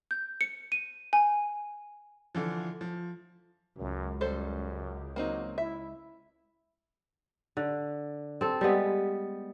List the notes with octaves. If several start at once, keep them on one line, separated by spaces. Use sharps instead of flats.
G6
C#7
D#7
G#5
D3 E3 F3
F3
C#2 F#2
F#2 G3 A4 C5
F#3 A#3 C4 D#4
E4 E5
D3
C4 A4
G3 G#3 B3